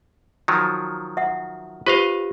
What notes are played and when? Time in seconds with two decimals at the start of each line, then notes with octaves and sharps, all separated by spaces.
0.48 D#3 F3 F#3
1.17 E5 F#5
1.86 F4 G4 B4 C5 D#5 F5